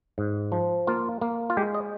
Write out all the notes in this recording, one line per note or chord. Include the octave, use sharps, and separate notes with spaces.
G#2
F3
A#3 F4
A#3
F4
G#3 G4
D#5